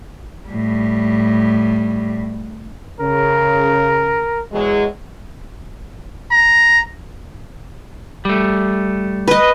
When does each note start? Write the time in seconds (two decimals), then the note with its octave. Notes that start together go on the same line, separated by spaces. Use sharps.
0.48 A2 G3
3.00 C#3 A#4
4.53 E2 F#3 G#3
6.31 A#5
8.25 G3 A3
9.28 B4 D#5